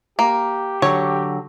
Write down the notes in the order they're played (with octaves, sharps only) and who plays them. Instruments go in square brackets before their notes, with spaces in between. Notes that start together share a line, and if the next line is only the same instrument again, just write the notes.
[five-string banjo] A#3 [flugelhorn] G4
[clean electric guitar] D3 F#3 [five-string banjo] C#5